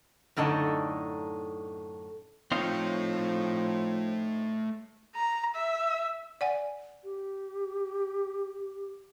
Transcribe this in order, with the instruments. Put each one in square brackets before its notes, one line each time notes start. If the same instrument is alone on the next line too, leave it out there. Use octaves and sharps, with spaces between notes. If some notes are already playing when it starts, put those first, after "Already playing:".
[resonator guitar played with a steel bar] F#2 A2 D3 D#4 A5
[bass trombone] F3 [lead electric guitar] A3 C#5 [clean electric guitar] C4 D#4 F5
[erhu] A#5
E5
[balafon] D5 F#5 G#5
[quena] G4